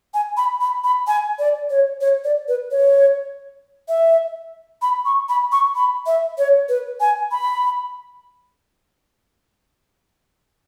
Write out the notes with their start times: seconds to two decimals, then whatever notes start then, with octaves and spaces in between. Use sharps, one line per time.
0.14 G#5
0.37 B5
0.61 B5
0.84 B5
1.07 G#5
1.39 D5
1.70 C#5
2.01 C#5
2.24 D5
2.48 B4
2.71 C#5
3.89 E5
4.82 B5
5.05 C#6
5.29 B5
5.52 C#6
5.76 B5
6.06 E5
6.38 C#5
6.69 B4
7.00 G#5
7.31 B5